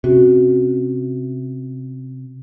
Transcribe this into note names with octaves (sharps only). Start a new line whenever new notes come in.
C3 C#4 F#4